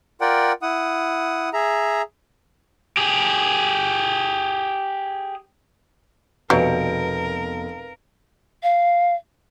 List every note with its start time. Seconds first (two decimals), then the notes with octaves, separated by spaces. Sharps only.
0.21 F4 A#4 D5 F#5 G5
0.62 E4 F#5 D#6
1.53 G#4 E5 A#5
2.97 G4 G#4
6.50 F1 B2 F#3 G3 A#4 B4 F5 D7
8.63 F5